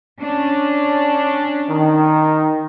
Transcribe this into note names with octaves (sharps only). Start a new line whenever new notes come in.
C#4 D4
D#3